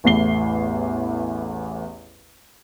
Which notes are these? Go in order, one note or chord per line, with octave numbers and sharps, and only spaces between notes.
A1 E2 A2 C7 G7